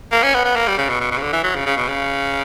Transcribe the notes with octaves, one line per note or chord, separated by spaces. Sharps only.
A#3
C#4
B3
B3
A#3
G3
C#3
B2
B2
B2
C#3
D3
E3
F#3
C#3
C#3
B2
C#3